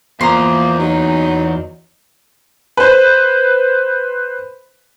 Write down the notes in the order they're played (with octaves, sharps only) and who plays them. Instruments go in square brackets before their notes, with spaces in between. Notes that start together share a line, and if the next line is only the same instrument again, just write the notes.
[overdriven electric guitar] E2 [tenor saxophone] F3 [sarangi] A#3 [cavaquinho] A#5 C6
[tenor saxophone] F#3 [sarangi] D#4
[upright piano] B4 C5